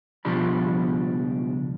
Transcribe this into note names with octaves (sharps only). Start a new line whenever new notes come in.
C#2 B2 F3 G3 D4 B5